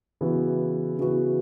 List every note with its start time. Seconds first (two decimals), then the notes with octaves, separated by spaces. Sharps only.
0.21 C#3 E3 B3 F#4
0.99 C#3 E3 B3 F#4